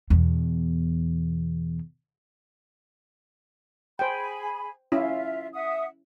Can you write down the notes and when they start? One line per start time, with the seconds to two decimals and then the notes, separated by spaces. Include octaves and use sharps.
0.10 E2 B2
3.99 G#4 C5 G5 G#5 B5
4.92 C#4 E4 F4 E5
5.53 E5 F#5 D#6